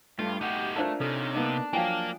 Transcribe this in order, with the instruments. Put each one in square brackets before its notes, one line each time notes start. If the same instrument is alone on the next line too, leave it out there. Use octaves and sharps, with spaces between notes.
[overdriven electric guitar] G2 [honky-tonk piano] A3 [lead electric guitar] F4
[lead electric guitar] D#4 F#4 [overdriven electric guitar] G4 F#5
[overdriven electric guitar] A3 [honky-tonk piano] D4 F4 A#4 [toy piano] C5 D5 A5
[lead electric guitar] C3 [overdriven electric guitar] C#4 D#4 [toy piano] A4
[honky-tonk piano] A#3 B3 D#4 [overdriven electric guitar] D4
[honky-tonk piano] F3 F#3 [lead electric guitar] A#3 [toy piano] F5 G5 G#5